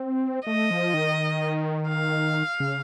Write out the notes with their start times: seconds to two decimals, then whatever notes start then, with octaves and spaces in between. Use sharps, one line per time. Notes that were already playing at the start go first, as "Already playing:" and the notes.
Already playing: C4
0.46 A3 D#5
0.71 F3
0.94 D#3
1.89 F5
2.60 C#3